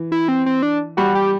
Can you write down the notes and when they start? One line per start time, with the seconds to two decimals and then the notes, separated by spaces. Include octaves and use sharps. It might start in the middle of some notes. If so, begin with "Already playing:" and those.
Already playing: E3
0.12 E4
0.28 C4
0.46 C4
0.63 D4
0.97 G3 F#4
1.15 G4